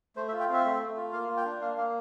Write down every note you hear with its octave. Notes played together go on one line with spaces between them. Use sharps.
A3 C5
E5
F4
G5
C4 E5
A3
A3
F4
A#3 F5
F4
G5
D4
A#3 F5
A#3 F5